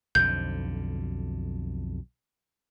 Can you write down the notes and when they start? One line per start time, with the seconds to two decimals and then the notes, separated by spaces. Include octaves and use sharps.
0.15 B1 F2 D3 G6